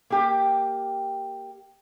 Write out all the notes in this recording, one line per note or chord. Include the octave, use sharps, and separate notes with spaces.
A#3 G4